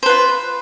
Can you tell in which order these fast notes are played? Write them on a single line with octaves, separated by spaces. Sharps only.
C5 B4 F4